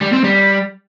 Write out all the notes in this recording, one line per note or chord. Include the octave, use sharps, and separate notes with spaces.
G3
C4
G3